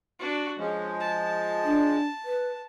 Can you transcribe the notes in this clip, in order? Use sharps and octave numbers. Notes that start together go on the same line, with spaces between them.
D4 F#4
F3 G#3 C#4
A5
D4
B4